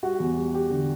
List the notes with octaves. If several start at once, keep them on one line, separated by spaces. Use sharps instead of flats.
G3 F#4
E2
G3
G3 G4
D3